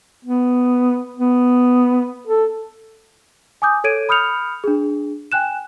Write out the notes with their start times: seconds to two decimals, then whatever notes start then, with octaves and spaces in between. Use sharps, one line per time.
0.25 B3
1.17 B3
2.27 A4
3.62 G#5 D6 D#6 G6
3.84 A4 C#5 G#6 D7 D#7
4.09 B5 D#6 F6 G6 C#7 F7
4.64 D4 G#4
5.32 G5 G#5 F#6 E7